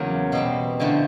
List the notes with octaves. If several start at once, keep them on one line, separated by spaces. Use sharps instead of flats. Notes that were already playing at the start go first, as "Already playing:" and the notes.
Already playing: E2 C#3 F#3 A#3
B2 G3 C4
D3 F3 A3 C4 E4